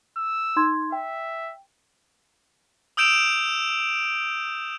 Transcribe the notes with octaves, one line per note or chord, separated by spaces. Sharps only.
E6
D#4 C6 G#6
E5 G5
D#6 E6 G6 D7 E7 F7